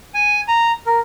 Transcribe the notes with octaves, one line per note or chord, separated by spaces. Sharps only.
G#5
A#5
A#4